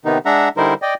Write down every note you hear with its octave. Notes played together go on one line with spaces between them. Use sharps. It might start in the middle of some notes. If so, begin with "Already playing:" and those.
C3 D#3 B3 D#4
G#3 D4 E5 F#5 A#5
D3 G3 D#4 E4 A#4 C5
D5 D#5 G5